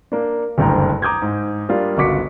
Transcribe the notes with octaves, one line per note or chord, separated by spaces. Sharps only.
A#3 D4
F#1 D2 G2 G5 A#5
A#5 D6 D#6 G6 G#6
G#2
G3 A#3 D4 F4
G1 C#2 F#4 D6 B6 C#7